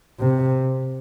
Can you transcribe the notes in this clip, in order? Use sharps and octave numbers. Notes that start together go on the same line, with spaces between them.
C3